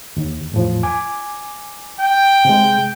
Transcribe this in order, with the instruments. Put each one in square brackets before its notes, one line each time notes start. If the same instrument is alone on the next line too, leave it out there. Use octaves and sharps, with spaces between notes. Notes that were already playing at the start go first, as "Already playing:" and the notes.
[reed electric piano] D#2
E2 A2 F3
G#5 D6
[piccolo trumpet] G5
[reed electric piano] C3 G#3